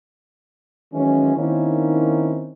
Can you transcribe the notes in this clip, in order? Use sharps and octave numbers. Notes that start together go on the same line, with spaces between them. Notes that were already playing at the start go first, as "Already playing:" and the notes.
D#3 E3 F#3 G#3 C#4
D#3 A#3 C4 C#4 D#4 E4